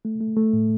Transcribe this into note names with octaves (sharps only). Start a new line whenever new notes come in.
A3
A3
A3
A2